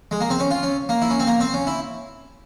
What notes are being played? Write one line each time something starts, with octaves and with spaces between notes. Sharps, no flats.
G#3
A#3
C4
C#4
F4
C#4
A#3
E4
C#4
C4
A#3
C4
C#4
E4